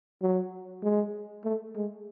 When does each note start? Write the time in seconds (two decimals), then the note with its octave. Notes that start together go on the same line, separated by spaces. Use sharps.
0.22 F#3
0.83 G#3
1.45 A3
1.76 G#3